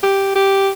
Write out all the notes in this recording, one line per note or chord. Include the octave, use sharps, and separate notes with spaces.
G4
G4